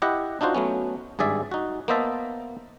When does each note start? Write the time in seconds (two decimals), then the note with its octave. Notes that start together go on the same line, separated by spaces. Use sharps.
0.02 E4 G4 D#5 F#5
0.41 D4 D#4 F4 F#4 C5
0.55 F#3 A3 B3 C#4
1.19 G#1 G2 G#4 D5 E5
1.51 D#4 F#4
1.88 A#3 B3 C5 D#5 E5 A5